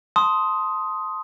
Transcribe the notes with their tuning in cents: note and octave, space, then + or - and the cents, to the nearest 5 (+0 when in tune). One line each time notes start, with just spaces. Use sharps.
A5 +0 C6 +0 D#6 +10